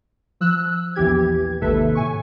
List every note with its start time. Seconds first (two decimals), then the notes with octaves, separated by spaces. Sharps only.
0.41 F3 E6 F#6
0.95 A#1 E2 E3 G4 G#6
1.61 G#1 D#2 C3 A4 B4 E5
1.95 A2 G#5 C#6